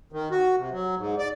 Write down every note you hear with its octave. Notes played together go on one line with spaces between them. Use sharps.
D#3
F#4
C3
F#3
G#2
D5